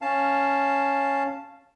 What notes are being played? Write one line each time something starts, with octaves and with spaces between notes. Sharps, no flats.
C#4 F5 A5